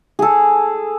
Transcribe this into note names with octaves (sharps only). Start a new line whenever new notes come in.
G#4 A4